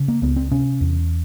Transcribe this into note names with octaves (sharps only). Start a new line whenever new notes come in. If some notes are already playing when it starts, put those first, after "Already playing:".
Already playing: C#3
A#3
C#2 B3
C4
C3 C#4
E2